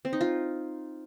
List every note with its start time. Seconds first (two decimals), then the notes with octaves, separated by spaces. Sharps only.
0.05 C4
0.13 D#4
0.21 F4